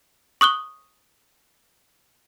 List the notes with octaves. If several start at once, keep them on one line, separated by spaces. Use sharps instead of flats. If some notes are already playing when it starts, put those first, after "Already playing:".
C#6 D#6 F#6 G7